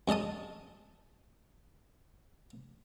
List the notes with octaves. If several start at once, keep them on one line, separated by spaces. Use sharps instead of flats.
F#2 G#3 D#5 A5 D#6